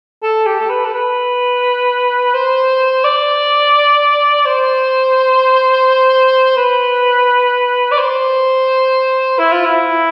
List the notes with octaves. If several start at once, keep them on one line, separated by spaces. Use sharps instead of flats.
A4
G4
A4
B4
A4
B4
C5
D5
C5
B4
D5
C5
E4
F4
E4